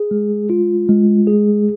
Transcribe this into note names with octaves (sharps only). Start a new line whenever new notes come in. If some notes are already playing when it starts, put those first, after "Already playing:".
Already playing: G#4
G#3
F4
G#3
G#4